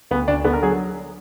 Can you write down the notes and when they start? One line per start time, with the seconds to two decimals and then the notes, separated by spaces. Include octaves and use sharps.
0.11 D2 B3
0.27 D2 D4
0.45 D3 B3
0.53 A#4
0.63 F#3 G#4